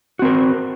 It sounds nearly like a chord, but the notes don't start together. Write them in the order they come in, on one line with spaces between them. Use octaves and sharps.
F#4 C4 A#4